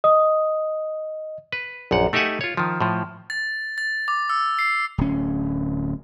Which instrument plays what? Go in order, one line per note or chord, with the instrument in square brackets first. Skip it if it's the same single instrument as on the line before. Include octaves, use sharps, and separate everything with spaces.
[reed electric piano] D#5 [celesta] D#6
[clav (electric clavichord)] B4
A#1 F#2 F#5
A3 D#4 G4 E5 F#5 G#5
F4 C#5
D#3 F3
A2 F3
[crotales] A6
A6
D6
E6
C7
[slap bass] D1 C#4